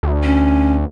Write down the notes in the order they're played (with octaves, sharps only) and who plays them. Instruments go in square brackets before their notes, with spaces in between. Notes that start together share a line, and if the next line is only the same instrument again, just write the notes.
[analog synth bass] D2
[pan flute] C#4